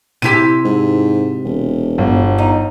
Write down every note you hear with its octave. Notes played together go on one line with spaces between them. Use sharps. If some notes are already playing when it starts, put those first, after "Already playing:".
C3 E4 G4 B6 D#7
G#2
E1
G1
D#4